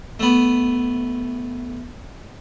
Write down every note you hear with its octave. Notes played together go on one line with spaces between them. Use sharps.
A3 B3